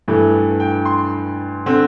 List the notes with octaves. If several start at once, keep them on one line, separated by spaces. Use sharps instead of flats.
G2 E3 A3
G5
C6
D3 C4